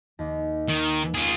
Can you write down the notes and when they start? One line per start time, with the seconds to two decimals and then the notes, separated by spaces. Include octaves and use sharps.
0.19 D#2 D#5
0.68 D#3
1.15 F4 G#4